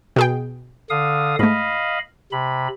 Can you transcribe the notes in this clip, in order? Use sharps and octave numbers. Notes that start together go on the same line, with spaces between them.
B2 G#4 G5
D3 F5 D#6
G#2 A3 D#5 F5 B5
C3 B5